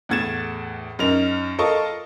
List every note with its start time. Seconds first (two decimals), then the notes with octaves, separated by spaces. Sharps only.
0.09 E2 A2 F#5 G#6 A6 E7
0.99 F#2 D#4 A#4 F7
1.58 F4 A4 A#4 D#5 A5 C#6